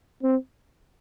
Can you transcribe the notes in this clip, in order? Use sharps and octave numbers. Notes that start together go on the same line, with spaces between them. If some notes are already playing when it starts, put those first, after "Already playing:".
C4